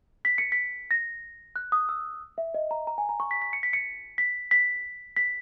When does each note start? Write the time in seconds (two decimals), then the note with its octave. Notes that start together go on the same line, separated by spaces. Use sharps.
0.25 B6
0.38 C#7
0.52 B6
0.91 A#6
1.56 F#6
1.72 D#6
1.89 E6
2.38 E5
2.54 D#5
2.71 A#5
2.87 A#5
2.98 G#5
3.09 A#5
3.20 C#6
3.31 B6
3.42 B6
3.53 C#7
3.63 B6
3.73 C#7
4.18 B6
4.51 B6
5.16 B6